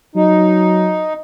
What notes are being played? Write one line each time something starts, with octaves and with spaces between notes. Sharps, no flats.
F#3 D#4